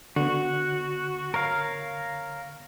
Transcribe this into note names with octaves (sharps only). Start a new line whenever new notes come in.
D3 B3 F#4
A#4 C#5 F5